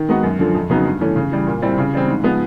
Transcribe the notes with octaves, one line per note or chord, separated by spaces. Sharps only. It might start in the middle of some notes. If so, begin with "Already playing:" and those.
Already playing: D#3
G#3 B3 D#4 F#4
F#2
D3 F3
F2
C#3 F#3 B3 D#4
G2
E3 A3 C#4
C#3
E3 G3
A#2
G3 C4 E4
C#3
E3 G3 C4
G#2
F3 G#3 B3